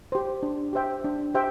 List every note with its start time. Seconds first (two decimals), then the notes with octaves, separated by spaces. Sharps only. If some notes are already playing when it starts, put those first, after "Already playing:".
0.12 G4 C5
0.43 D4
0.73 G4 C5 E5 G5
1.04 D4
1.34 G4 C5 E5 G5